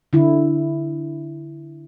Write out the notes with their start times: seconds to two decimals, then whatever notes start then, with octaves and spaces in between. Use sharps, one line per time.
0.13 D3 E4